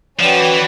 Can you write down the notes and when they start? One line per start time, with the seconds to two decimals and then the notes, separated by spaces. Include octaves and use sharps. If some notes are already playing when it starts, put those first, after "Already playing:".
0.19 F3 C#4 F#4 B4 D5 G5
0.40 E3